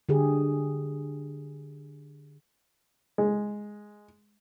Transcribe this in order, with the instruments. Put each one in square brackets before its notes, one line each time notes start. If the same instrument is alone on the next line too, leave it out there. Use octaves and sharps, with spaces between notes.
[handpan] D3 G4 G#4
[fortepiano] G#3